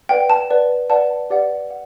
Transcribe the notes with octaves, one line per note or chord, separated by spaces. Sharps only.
B4 D5 F#5 G5
A5
B4 D5 F#5
B4 D5 F#5 A5
G4 B4 D5 F#5
F#5